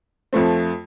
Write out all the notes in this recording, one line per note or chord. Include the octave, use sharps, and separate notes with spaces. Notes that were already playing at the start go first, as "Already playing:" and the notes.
F2 F3 A3 C4